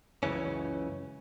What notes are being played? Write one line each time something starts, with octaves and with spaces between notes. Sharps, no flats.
C#2 F#2 C#3 E3 C#4